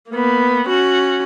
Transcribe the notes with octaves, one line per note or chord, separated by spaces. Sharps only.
A#3 B3
C#4 F#4